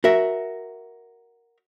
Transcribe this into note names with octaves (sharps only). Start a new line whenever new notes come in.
F#4 A#4 E5